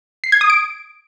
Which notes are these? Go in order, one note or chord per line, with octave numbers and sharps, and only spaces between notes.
C7
G#6
D#6
D7